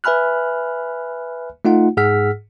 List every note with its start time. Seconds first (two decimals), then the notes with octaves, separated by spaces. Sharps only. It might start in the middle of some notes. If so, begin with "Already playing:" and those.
0.04 B4 E5 G#5 B5 F6 F#6
1.65 A3 D#4 F4 F#5
1.97 G#2 G#4 F#5 E6 F6 B6